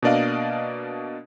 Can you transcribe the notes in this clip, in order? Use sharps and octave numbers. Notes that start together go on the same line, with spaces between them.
B2 A#3 D4 D5 D#5 F5